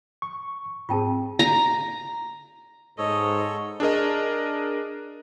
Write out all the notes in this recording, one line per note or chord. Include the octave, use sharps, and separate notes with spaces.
C#6
G#2 C4 F4 G#4 G5 A5
A#5
G#2 A4 C#5 D#5
D4 G#4 A#4 D#5